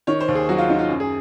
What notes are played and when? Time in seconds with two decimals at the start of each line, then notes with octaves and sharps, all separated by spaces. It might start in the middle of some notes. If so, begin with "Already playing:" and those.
0.07 D#3 C#5
0.20 C5
0.28 D#2
0.35 G#4
0.49 F#3 F#4
0.58 F4
0.69 D#3 D#4
0.79 F4
0.89 F#2
1.00 G#4